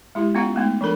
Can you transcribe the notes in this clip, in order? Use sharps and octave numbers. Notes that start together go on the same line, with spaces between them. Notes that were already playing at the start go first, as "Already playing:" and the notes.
G#3 E4 G4
B3 C#4 F4 F5 F#5
G#3 A3 B3 D#4
F3 D4 A4 A#4 B5